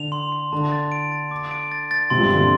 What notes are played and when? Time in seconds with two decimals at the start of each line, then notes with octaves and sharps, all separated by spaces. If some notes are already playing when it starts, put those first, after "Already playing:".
Already playing: D3 F7
0.12 C6
0.32 C6
0.52 D3 A5
0.72 A6
0.92 D7
1.12 A6
1.31 D6
1.51 D7
1.72 A6
1.91 A6
2.10 C3 C4 C6
2.17 F3
2.21 G2 G3
2.30 D3 C6
2.40 C3